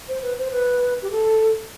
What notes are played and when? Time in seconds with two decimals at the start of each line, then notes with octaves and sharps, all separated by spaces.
0.09 C5
0.22 B4
0.38 C5
0.52 B4
1.02 G4
1.11 A4